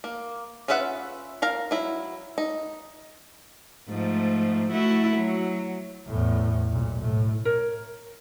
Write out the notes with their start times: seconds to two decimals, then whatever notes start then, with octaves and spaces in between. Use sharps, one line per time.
0.04 A#3
0.68 C#4 F4 B4 E5 F#5
1.42 A#4 F5 A#5
1.71 F#3 E4
2.38 D#4
3.89 G#2 F3 A3
4.70 A3 E4 F#4
5.16 F#3
6.08 E2 A2
6.71 B1 A#2
7.01 A2
7.45 A#4 C#5